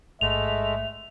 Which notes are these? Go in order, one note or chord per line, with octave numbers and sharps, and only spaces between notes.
A1 G#2 G#3 A3 E5 F#5 F7